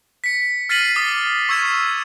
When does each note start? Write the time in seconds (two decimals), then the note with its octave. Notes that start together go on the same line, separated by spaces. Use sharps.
0.24 B6 C#7
0.69 F6 A6 B6 C7 D#7 F#7
0.96 D6 D#6 A6 G7
1.49 C#6 E6 G#6 C7 E7